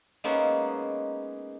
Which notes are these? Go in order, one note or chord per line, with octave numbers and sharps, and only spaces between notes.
G#3 A#3 B3 C#4 D#4 E5